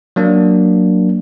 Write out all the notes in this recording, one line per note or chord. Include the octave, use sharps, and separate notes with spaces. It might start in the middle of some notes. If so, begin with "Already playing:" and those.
F#3 A#3 D4